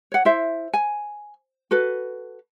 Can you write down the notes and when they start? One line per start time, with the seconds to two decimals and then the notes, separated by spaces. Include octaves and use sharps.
0.12 C#5 F#5
0.25 E4 C5 E5
0.74 G#5
1.71 F#4 A4 B4